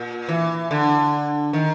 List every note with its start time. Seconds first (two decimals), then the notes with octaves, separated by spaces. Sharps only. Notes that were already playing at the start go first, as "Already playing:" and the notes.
Already playing: A#2
0.29 E3
0.71 D3
1.53 D#3